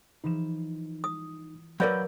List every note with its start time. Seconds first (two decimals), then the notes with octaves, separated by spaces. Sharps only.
0.24 E3 F3 D#4 E7
1.04 D#6
1.80 F#3 A#4 B4 D5 F5 F#5 B5 G6